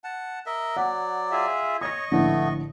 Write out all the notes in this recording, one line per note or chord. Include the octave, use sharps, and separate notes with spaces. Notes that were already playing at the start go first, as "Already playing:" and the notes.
F#5 A5
A#4 D#5 E5
F#3 D5 F#5
F4 G#4 E5
C#5 D#5 C#6 D#6 A#6
A#1 A2 D3 A3 B3